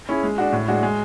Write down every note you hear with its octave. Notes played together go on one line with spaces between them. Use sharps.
C#4 E4 G#4
G#3
D4 F#4
A2
G#3 D4 F#4
G#3